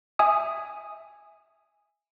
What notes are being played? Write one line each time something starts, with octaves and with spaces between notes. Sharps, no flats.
E5 G#5 D#6